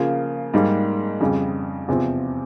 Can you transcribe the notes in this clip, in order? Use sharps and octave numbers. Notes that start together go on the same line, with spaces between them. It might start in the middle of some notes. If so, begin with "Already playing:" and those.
Already playing: C#3 F3 A#3 F4
G#2 G3 A#3
F2 C#3 G3
E2 C3 F3 C4